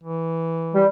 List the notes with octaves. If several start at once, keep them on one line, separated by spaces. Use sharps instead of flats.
E3
G3